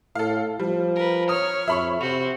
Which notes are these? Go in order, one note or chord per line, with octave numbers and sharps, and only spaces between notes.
A2 A4 F5
F3 G3
A#4 B4
C#5 D#6 F6
F2 E5 B5 C#6
C3 F#4 C5 F7